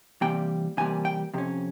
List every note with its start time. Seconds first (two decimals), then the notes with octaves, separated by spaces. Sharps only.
0.21 C3 E3 G3 A#3 G5
0.77 C3 E3 G3 A#3 G#5
1.05 G5
1.34 F2 C3 C#4